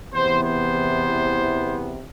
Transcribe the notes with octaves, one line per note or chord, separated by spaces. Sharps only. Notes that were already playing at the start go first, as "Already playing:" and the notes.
E2 C3 E3 B3 C5
C5